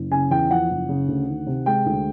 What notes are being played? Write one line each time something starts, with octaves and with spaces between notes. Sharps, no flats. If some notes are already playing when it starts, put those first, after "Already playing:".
Already playing: F#1
C#3 G#5
E2 G5
F3 F#5
F#1
C#3
D2
D#3
C3
G#3 G5
D2